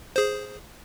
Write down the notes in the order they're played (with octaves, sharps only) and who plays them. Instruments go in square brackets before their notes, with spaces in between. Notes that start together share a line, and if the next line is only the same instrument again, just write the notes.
[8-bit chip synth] G#4 C5